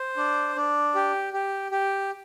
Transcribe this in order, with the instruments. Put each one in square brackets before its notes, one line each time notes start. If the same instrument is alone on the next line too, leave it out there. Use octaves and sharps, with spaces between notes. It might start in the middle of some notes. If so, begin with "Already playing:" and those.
Already playing: [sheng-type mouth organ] C5
D4
D4
G4
G4
G4